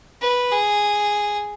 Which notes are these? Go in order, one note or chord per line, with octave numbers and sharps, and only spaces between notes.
B4
G#4